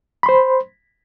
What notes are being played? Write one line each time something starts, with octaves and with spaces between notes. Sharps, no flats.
C5 B5 C6